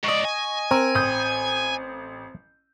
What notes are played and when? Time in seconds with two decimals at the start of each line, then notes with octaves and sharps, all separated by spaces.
0.04 G#2 D5 D#5 C#6
0.25 G#5
0.71 C4 A#4
0.95 A1 D#6 G6